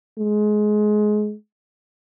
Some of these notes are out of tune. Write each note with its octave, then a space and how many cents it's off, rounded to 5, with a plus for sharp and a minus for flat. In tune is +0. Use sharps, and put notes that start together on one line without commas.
G#3 +20